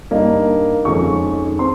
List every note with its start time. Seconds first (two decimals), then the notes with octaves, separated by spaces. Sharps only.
0.11 G2 G3 A#3 D#4
0.85 F2 D#3 G#3 C#4 C#6
1.59 C4 C6